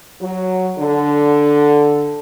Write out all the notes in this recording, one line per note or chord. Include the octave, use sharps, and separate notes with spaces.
F#3
D3